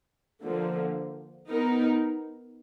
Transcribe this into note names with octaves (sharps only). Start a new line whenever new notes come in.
D3 F3 A#3
B3 D#4 A#4